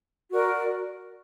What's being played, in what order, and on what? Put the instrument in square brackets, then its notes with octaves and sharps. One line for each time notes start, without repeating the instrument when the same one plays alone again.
[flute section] F#4 A#4 D5